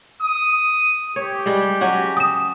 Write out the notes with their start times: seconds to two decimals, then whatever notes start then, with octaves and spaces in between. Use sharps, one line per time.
0.23 D#6
1.16 G4 C#5
1.46 G3 G#3
1.81 F#3 C#4 F#4
2.17 D#6 E7